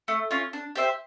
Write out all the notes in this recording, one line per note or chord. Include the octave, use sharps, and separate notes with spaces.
A3
C#4 F4
D4
G4 C5 E5